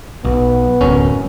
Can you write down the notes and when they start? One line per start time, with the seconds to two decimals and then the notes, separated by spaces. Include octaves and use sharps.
0.25 B1 B3
0.81 D1 C2 F#2 C#4